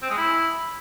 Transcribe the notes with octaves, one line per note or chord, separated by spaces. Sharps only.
C4
G#3
E4